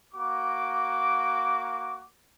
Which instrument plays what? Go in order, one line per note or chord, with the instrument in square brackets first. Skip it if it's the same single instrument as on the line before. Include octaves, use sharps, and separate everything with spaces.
[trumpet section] A#3 F#4 D6